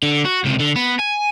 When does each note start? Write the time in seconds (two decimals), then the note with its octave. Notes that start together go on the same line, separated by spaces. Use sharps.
0.03 D3
0.25 F#4
0.45 C#2 C3
0.60 D3
0.76 B3
0.99 G#5